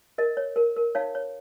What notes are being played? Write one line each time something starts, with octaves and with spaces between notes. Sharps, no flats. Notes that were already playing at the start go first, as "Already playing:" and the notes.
A#4 D#5
C#5
A#4
A#4
D#4 C#5 F5
C#5